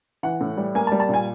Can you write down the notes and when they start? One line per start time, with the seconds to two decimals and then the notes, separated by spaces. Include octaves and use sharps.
0.23 E3 F#5
0.41 A2
0.57 G3
0.75 A#3 G#5
0.87 A5
0.92 G3
1.00 A5
1.09 A#2 G#5